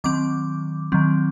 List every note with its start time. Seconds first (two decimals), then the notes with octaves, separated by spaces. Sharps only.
0.04 D#3 F#3 C4 D6
0.92 D#3 F#3 C4